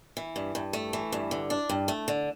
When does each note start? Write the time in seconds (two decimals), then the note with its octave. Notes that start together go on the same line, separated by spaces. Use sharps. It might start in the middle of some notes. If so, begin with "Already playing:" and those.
0.17 E3
0.36 G2
0.55 G2
0.73 A3
0.93 E3
1.12 G2
1.31 D3
1.50 D4
1.69 G2
1.88 A3
2.08 D3